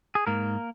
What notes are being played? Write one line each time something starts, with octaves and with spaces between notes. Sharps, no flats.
G#4
G#2 A#3 A#4